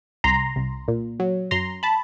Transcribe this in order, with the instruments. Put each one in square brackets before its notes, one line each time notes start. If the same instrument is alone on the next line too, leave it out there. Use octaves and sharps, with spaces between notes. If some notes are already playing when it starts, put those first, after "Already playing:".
[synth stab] C2 A#5 C6
C2
A#2
F#3
F#2 A#5 C6
A5 B5